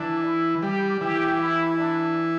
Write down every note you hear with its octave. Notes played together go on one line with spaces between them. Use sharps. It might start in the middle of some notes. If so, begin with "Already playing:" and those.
Already playing: E3 D4
E4
G3 G4
E3 G4
E4
D4